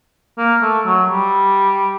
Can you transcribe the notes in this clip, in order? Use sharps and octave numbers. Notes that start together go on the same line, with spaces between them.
A#3
A3
F#3
G3